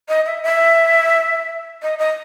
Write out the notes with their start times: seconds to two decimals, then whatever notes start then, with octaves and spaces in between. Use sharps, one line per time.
0.09 D#5
0.26 E5
0.43 E5
1.83 D#5
1.99 D#5